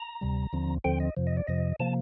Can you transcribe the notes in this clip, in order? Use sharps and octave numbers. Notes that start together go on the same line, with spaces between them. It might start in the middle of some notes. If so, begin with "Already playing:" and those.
Already playing: A#5
D2 C3 G3
D#2 D3 F3 C4
D#2 D3 F3 C4 G5
D#5
F2 C3 F3
D#5
D5
F2 C3 F3 D#5
C3 F3 A#3 A5